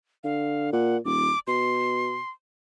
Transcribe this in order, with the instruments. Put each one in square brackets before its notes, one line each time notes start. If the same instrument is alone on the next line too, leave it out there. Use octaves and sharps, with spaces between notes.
[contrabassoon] D3 [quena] F5
[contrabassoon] A#2 [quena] F#5
[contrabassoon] D#1 [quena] D6
[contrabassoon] B2 [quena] C6